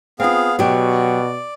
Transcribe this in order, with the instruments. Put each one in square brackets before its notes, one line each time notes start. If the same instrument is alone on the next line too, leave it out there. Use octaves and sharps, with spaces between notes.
[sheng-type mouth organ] B3 G#4 F5 [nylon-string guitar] C4 F4
[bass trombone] B2 [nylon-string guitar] F#3 G4 [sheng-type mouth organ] D5